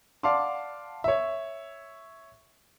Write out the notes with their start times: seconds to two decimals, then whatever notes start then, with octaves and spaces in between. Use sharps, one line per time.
0.23 D5 F5 F#5 A5 C6 D6
1.04 C#5 E5